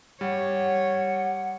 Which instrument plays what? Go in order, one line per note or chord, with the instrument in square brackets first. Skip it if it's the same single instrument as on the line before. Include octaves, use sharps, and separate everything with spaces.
[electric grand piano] G3 [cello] C#5 [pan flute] F#5